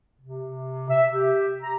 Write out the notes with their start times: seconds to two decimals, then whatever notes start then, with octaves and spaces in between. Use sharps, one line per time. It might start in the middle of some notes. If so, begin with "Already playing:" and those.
0.20 C3
0.89 E5
1.12 G4
1.62 A#5